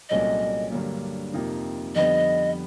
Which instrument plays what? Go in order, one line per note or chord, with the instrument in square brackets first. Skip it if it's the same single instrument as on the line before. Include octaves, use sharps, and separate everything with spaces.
[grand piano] C2 A#2 F#3 A3 C#4 [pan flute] D#5
[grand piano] G2 D3 F#3 A#3
F2 C3 F3 A#3 D#4
[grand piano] F2 D3 G3 B3 [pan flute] D#5